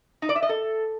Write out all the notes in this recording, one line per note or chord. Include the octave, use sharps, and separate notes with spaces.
D#4
D5
E5
D#5
A4